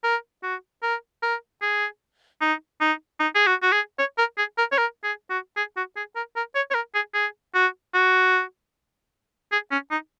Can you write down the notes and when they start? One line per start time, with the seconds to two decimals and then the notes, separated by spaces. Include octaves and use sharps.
0.04 A#4
0.43 F#4
0.83 A#4
1.23 A#4
1.62 G#4
2.41 D#4
2.80 D#4
3.20 D#4
3.35 G#4
3.47 F#4
3.62 F#4
3.72 G#4
3.99 C#5
4.18 A#4
4.38 G#4
4.58 A#4
4.72 C#5
4.78 A#4
5.04 G#4
5.30 F#4
5.57 G#4
5.77 F#4
5.96 G#4
6.16 A#4
6.36 A#4
6.55 C#5
6.71 C#5
6.74 A#4
6.94 G#4
7.14 G#4
7.54 F#4
7.94 F#4
9.52 G#4
9.71 C#4
9.91 D#4